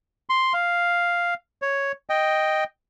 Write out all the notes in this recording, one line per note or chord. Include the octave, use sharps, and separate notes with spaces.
C6
F5
C#5
D#5 G5